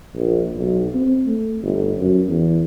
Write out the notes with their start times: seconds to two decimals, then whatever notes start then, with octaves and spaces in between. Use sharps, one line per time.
0.15 A#1
0.56 B1
0.94 C4
1.26 A3
1.62 G1
1.98 F#2
2.28 E2